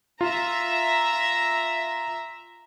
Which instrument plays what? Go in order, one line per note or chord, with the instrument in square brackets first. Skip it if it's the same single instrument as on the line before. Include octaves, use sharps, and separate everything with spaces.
[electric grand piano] F4 [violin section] E5 A#5